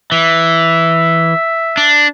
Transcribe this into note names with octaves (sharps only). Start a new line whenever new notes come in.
E3 E5
D4